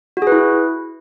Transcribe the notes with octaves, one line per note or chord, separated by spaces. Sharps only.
F#4
G#4
B4
E4